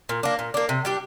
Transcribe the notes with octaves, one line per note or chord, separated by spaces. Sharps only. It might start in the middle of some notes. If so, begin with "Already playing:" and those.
A#2
A#3 D4
A#2
A#3 D4
C3
G3 D4 G4